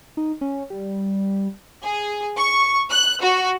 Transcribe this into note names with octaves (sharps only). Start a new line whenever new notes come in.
D#4
C#4
G3
G#4
C#6
F#6
F#4